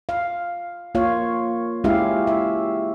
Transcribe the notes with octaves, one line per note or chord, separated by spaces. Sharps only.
F5
A#3 F4 C#5 F5
G#3 C#4 E4 G4 E5 F5
E5